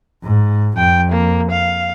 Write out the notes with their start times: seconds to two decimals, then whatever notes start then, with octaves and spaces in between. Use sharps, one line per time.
0.24 G#2
0.77 F2 G5
1.12 A#3
1.51 F5